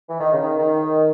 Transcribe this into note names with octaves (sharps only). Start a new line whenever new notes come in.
E3
D#3
C#3
D#3
D#3